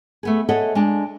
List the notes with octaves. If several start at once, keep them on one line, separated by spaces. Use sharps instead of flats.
A3 B3 G#4
G#4 A4 C#5 D#5 E5 F#5
G#3 D4